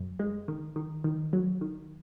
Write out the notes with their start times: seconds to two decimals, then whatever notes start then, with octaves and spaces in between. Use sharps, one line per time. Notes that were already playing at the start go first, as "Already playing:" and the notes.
Already playing: F#2
0.19 G#3
0.48 D#3
0.76 D#3
1.04 D#3
1.33 F#3
1.61 D#3